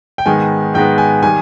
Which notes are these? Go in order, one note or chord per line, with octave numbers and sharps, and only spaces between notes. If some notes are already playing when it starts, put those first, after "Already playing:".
G5
G#2 D#3 G#3 B3 G#5
G#2 D#3 G#3 B3 G5
G#5
D#3 G3 G#5